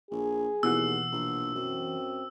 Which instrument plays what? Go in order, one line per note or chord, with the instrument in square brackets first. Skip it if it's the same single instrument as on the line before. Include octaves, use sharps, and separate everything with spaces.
[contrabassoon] A#1 [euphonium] G#4
[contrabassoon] D#2 [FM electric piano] B2 E3 F#5 [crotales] E6
[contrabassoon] A#1
[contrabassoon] F#2 [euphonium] C4